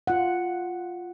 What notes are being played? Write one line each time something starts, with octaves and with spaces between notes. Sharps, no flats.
F4 F#5